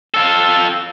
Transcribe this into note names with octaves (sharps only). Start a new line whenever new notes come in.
F4 A4